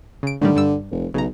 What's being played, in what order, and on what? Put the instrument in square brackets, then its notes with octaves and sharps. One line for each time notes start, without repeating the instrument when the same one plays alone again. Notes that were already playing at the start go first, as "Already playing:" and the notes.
[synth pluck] C#3 D7
[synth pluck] A2 D#3 G3 [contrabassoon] D3
[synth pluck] G2 G3 E6
[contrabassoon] F1
[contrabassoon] B1 [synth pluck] C#3 A#5